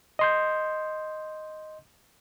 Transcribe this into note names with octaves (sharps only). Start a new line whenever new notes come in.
D#5 C6 G6